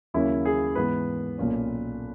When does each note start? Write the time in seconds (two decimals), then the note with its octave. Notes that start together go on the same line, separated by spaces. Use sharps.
0.14 D#2 C#3 F#3 A#3 C#4 E4
0.45 G#4
0.75 G#2 E3 B3 B4
1.38 B1 A#2 A#3 C#4